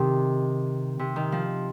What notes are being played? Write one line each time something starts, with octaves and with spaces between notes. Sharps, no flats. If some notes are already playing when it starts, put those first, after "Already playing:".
Already playing: C3 D#3
C3
D#3
F3